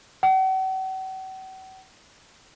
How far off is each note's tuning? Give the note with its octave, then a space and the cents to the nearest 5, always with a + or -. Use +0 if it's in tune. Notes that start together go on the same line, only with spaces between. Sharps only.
F#5 +45